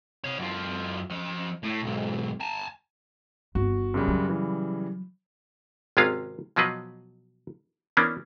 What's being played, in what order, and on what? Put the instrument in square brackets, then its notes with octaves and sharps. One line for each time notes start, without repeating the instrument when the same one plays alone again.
[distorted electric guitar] C3 C#5
F#2 F4
F3 D#5
A2
B1 G#2
G#5 A5
[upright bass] G1 [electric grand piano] F#4
[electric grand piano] F#2 C#3 G3
[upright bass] F#3
[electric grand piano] C#3 E3 G3
[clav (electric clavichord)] G#1 C3 G#3 C#4 F4 F5
B2 F3 F#3 F4 B4 D#5
E3 A#3 B3 C#4 D4